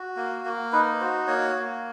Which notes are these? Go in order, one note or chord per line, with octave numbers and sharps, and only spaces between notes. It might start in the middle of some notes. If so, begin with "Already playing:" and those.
Already playing: F#4
A#3
A#3
D#4 B4
F#4 C5
A#3 C#5
A#3